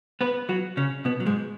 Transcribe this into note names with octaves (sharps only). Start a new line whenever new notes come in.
B3 B4
F#3 F#4
C#3 C#4
B2 B3
F#3
G#2 G#3